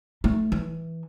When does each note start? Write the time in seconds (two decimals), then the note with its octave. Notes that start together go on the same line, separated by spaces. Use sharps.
0.24 A3
0.52 E3